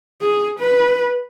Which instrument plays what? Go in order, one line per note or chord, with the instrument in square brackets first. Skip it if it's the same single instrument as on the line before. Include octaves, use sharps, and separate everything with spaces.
[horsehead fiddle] G#4
B4